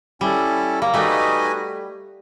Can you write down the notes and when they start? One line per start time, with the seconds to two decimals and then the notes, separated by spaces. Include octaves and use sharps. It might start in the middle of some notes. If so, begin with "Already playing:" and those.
0.21 G3 C#4 E4 A4
0.82 A#3
0.94 G3 A3 D#4 F#4 B4 D#5 G#5